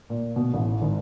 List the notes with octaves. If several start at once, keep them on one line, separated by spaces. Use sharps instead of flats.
A#2
B2
A1
G#1